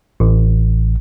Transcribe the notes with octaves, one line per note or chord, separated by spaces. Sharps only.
A1